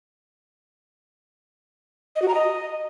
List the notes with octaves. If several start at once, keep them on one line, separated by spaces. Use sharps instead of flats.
D#5
F#4
A#5
D#5